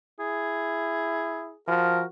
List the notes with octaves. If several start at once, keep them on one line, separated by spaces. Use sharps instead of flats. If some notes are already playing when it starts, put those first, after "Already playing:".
E4 G#4
F3 F#4 A#4